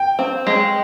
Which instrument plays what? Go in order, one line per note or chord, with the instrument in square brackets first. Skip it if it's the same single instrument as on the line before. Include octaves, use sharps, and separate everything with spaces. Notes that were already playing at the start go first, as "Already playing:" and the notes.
Already playing: [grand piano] G5
[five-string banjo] C4
G#3